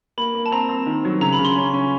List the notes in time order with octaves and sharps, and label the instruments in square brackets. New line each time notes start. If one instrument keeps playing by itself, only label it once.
[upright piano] A#3 [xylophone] B5
[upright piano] A#3
[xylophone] A5
[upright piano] C4 [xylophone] A#5
[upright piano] C4
D#3
F#3
[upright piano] C#3 [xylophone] A#5
[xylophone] B5
[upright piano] C#3
[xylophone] C6
[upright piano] C#4
C#4